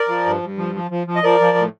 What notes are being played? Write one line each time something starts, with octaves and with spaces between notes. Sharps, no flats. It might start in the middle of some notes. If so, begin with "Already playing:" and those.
Already playing: A#4 D5
F3
G2
G2
F3
F3
F3
F3
D#5
F3 A#4 D5
F3
A2